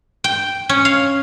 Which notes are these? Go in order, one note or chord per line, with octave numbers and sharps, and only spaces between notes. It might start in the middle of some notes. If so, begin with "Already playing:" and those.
G5
C#4
F5